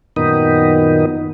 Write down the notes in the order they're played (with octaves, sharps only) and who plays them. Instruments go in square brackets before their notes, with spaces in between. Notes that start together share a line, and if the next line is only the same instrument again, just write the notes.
[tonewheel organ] F#2 A#2 D#3 B3 D#4